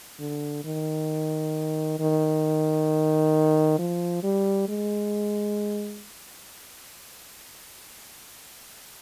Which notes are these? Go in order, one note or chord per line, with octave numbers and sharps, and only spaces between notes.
D3
D#3
D#3
F3
G3
G#3